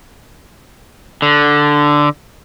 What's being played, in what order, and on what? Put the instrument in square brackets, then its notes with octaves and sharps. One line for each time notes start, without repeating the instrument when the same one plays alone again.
[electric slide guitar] D3